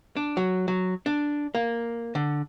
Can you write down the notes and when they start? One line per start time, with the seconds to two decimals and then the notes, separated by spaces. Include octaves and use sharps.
0.16 D4
0.37 F#3
0.68 F#3
1.06 D4
1.55 A#3
2.15 D3